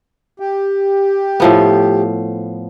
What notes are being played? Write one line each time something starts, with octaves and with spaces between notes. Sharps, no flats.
G4
A2 F3 B3